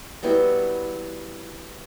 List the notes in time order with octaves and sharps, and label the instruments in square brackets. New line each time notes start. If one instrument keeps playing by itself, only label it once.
[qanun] F#3 G3 B3 E4